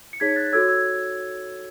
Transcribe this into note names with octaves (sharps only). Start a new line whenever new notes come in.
C#7
D#4 G#4 C#5 G#6 B6
F#6 A6
F#4 A4 C#5 E6 G#6
E6 G#6